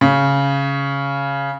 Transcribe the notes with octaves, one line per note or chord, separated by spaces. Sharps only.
C#3